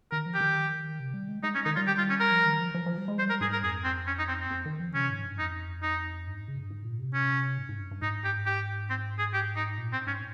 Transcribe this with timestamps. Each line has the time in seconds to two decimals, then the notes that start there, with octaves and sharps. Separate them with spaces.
0.11 D#3 A#4
0.26 F3
0.34 G4
0.41 D#3
1.00 C3
1.14 G3
1.29 G#3
1.43 G#3 D#4
1.55 C#4
1.65 D#3 D#4
1.76 G3 F4
1.87 G4
1.98 F4
2.09 C#4
2.20 A#4
2.31 F3
2.46 D#3
2.60 F3
2.74 F3
2.86 F3
2.97 G3
3.08 G#3
3.19 G3 C5
3.30 A#4
3.41 G#2 G#4
3.52 A#4
3.63 F2 G#4
3.84 C4
4.07 C#4
4.18 D#4
4.28 C4
4.40 C4
4.50 F2
4.66 D#3
4.80 F3
4.94 C3 C#4
5.09 G#2
5.24 G2
5.38 F2 D#4
5.82 D#4
6.27 G2
6.38 G#2
6.48 C#3
6.59 G2
6.70 G#2
6.85 A#2
6.99 C3
7.14 C#4
7.58 G#2
7.69 G#2
7.80 G2
7.91 G2
8.02 G#2 D#4
8.24 G4
8.46 G4
8.90 C4
9.19 G#4
9.33 G4
9.56 D#4
9.78 A#2
9.93 C4
10.07 G#2 C#4